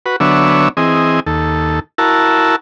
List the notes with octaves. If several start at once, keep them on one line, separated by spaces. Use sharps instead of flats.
F#4 B4
D3 F#3 B3 D4 C#5 E5
E3 C4 G#4 D#5
D#2 A4
E4 F#4 A#4 A5